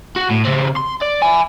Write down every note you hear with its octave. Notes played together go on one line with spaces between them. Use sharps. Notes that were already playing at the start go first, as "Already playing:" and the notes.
F#4
A2
C#3 C4
C6
D5
E5 G#5